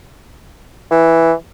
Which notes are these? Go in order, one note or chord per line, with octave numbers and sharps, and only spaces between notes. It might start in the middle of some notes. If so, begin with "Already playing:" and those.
E3